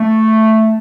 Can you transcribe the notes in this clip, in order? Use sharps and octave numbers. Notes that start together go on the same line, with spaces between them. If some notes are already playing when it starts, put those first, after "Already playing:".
Already playing: A3